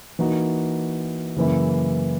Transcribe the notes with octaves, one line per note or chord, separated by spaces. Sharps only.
E3 A#3 D#4 F#4
F#2 C#3 E3 A#3 E4